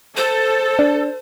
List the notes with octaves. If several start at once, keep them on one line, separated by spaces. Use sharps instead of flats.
A4 C5
D4